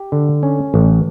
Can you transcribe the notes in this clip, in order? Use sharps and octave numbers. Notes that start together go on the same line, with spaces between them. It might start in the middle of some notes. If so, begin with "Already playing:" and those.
Already playing: G4
D3
C#4
A1